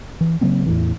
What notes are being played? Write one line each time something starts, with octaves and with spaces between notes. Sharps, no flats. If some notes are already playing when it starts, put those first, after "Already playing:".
E3
C#3 F#3 A#3 C4
E2 A2 E3